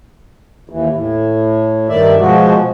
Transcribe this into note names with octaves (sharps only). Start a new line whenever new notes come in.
D#2 E3
A2
G2 D#3 D5 E5
B2 F3 G#3 F#4